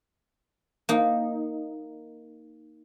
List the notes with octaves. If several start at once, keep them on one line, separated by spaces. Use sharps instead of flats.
A#3 D#4